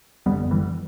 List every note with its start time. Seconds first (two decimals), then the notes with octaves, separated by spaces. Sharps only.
0.26 F#2 D3 G3 B3
0.51 E3 G3